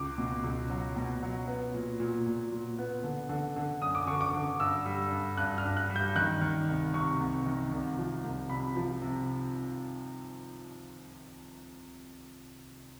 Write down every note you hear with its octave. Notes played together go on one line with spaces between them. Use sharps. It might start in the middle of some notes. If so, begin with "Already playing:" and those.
Already playing: C#2 D6
B2
C#2
F#3
B2
F#3
B3
A#2
A#2
A#2
A#2
B3
D3
D3
D3
F#2 D#6
D6
D3 C#6
D6
D3
G2 E6
G3
G2
G2 F#6
F6
G2
F#6
G3
G6
D#3 F#6
D#3
C2
C3 C#6
C2
D#3
C2
F3
C2
C3 B5
F3
C3